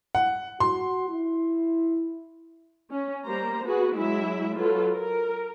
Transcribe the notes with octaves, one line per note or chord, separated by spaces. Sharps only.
F#5
F#4 C6
E4
C#4
G3 A#3 C5 A#5
B3 F#4 G#4 B4
F#3 G#3 E4 E5
F#3 F4 A4 B4
A#4